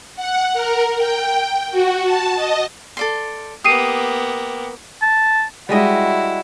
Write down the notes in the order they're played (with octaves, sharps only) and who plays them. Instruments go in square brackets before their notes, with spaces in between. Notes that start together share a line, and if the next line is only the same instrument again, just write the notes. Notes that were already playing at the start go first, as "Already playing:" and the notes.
[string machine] F#5
A#4
G5
F#4
A5
D#5
[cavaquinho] A4 D5 C6
[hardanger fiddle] A#3 B3 [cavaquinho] G4 [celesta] D#6 C7 D#7
[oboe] A5
[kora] G3 G#3 D#5 [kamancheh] E4 F#4